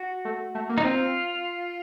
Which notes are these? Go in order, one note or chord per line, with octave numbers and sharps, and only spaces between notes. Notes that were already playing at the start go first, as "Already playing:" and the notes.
Already playing: F#4
A3
A3
A#3
D#4
C4 F4